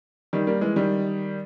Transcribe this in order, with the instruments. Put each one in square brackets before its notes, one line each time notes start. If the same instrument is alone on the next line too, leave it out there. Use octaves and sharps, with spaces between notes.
[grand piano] D#3 G3
G3 A#3
E3 G#3
D#3 G3